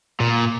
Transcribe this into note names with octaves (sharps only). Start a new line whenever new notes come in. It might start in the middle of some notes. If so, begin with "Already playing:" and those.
A#2